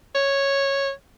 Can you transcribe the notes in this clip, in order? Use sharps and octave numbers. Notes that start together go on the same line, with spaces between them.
C#5